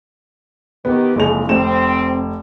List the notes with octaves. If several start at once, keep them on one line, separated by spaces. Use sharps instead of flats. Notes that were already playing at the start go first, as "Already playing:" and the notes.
D#3 B3 G4
F#1 F2 G#3 F7
F1 C4 E7